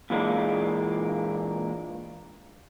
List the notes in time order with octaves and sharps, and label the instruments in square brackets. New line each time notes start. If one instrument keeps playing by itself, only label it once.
[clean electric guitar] A#2 E3 G#3 A#3 D4